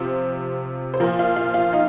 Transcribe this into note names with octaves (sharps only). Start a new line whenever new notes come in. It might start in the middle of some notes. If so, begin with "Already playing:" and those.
Already playing: C3 F3 C5
C5
A#2 F3 A#4
F4
F4
F4
D#4